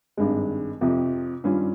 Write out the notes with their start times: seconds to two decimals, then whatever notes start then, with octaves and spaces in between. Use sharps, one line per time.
0.17 G#1 G2 D#3 G#3
0.81 F2 C3 F3
1.44 G2 D#3 G3 C#4 F4